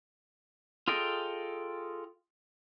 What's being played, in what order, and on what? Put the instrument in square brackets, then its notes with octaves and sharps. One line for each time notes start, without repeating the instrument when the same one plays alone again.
[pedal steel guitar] F4 G#4 A4 D#5 G5